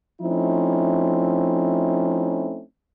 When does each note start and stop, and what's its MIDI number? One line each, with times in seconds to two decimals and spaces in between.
0.21 2.62 53
0.21 2.62 57
0.21 2.62 60
0.21 2.62 61
0.21 2.62 63
0.21 2.62 64